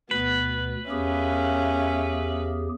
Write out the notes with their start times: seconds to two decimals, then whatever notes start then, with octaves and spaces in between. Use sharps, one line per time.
0.11 D2 B2 B3 B4
0.90 E2 C#4 G4 G#4 A#4 E5 F5